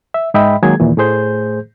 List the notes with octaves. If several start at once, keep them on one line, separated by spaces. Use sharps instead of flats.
E5
G#2 G#3 D#5 E5 G5 B5
D#3 F#3 G#3 A#3 G#4 G#6
D#2 A#2 E3
A2 A3 G#4 C5 G6